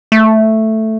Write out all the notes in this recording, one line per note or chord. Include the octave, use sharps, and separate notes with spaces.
A3